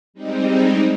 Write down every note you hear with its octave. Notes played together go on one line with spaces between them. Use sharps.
G3 G#3 C4 D#4